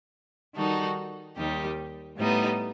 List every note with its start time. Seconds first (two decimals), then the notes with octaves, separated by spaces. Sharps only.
0.56 D#3 G3 D#4 F#4 A4
1.36 D#2 D#3 G3 D#4 G4
2.18 A2 G3 B3 D#4